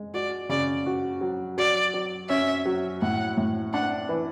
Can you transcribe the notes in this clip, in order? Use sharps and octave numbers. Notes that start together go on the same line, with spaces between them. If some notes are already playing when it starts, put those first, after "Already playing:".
Already playing: G#3
F#4 D5
C#3 D5
F#4
F#3
F#3 D5
F#3
C#4 E5
F#3
A2 F#5
A2
D4 F#5
E3